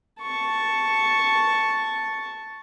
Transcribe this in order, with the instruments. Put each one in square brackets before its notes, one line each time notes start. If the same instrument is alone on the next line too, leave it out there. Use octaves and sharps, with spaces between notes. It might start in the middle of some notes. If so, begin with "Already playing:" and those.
[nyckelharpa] A5 C#6